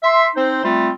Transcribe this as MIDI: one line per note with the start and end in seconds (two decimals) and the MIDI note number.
0.03 0.26 76
0.03 0.26 84
0.36 0.60 60
0.36 0.60 63
0.36 0.60 72
0.64 0.89 55
0.64 0.89 57
0.64 0.89 60
0.64 0.89 65